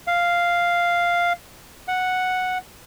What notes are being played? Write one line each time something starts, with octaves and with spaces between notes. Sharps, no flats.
F5
F#5